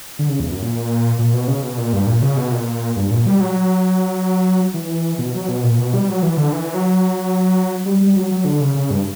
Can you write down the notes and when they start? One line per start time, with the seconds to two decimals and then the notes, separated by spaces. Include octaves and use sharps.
0.19 D3
0.29 C#3
0.40 E2
0.51 F#2
0.62 A#2
1.19 A#2
1.34 B2
1.47 C#3
1.63 B2
1.77 A#2
1.93 G2
2.07 A#2
2.22 C#3
2.37 B2
2.51 A#2
2.96 G2
3.11 A#2
3.26 G3
3.40 F#3
4.74 E3
5.19 B2
5.34 F#3
5.49 B2
5.63 A#2
5.78 B2
5.94 G3
6.08 F#3
6.23 E3
6.37 D3
6.53 E3
6.74 F#3
7.86 G3
8.01 G3
8.16 F#3
8.31 F#3
8.45 D3
8.61 C#3
8.75 C#3
8.91 G2